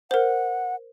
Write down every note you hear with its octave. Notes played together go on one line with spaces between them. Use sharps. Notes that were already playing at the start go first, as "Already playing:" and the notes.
A#4 C5 F#5